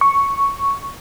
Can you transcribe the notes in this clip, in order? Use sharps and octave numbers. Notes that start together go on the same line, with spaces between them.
C#6